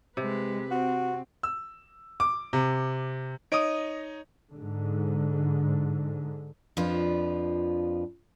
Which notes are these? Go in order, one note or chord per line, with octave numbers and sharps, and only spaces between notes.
C3 G#3 B4
C4 F#4
E6
D6
C3
D#4 C#5 D#5 D#6 D7
G#2 D3
F2 F3 D4 F4 B4